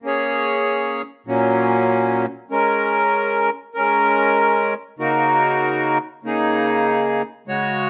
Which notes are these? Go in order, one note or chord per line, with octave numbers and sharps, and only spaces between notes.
A#3 C#4 G#4 C#5
A#2 F#3 A#3 C#4
G#3 C#4 A#4
G#3 C#4 A#4
C#3 A#3 D#4 F#4 A#4
C#3 A#3 D#4 G#4
C#3 G#3 F#4 C#5